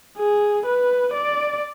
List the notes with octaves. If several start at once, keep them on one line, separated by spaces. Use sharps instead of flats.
G#4
B4
D5